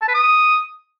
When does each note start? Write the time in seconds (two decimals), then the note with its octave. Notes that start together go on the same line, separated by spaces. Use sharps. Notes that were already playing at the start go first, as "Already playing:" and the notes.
0.02 A5
0.08 B4
0.14 D#6